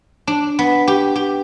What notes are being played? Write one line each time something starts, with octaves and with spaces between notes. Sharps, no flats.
D4
B3
G4
G4